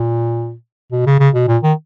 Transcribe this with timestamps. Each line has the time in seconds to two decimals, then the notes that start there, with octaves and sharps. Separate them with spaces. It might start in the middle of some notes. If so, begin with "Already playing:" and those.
Already playing: A#2
0.92 B2
1.06 C#3
1.20 C#3
1.35 B2
1.48 A#2
1.63 D#3